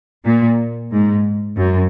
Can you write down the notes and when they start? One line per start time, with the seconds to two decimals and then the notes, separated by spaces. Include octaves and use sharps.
0.25 A#2
0.92 G#2
1.57 F#2